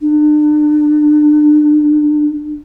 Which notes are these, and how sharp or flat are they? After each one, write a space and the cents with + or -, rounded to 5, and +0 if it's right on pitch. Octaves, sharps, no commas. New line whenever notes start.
D4 +35